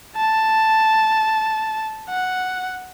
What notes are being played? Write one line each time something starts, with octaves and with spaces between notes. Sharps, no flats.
A5
F#5